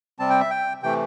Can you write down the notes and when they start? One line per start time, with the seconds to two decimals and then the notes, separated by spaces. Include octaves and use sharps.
0.19 C3 G3 C4 A5
0.30 G5
0.40 E5
0.50 G5
0.83 C3 E3 A3 G5